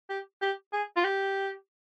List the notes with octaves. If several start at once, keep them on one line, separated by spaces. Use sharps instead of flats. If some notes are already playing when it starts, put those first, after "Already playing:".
G4
G4
G#4
F4
G4